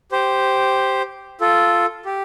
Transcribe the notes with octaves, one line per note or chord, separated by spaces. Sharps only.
G4 C5
F4 A4
G4